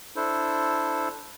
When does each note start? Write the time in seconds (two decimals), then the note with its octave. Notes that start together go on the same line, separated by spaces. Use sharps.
0.16 D4 E4 A4 C5